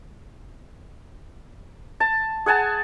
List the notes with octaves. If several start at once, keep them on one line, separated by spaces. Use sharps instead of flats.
A5
G#4 F#5 G#5 A5